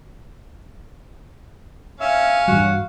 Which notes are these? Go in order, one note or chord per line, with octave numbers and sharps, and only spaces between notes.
C#4 E5 F5
G2 E3 G3 F#4